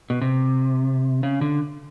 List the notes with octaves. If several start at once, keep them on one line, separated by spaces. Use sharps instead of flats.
B2
C3
C#3
D3